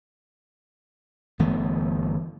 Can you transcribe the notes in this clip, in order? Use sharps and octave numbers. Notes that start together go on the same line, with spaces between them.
G1 E3 A3 B3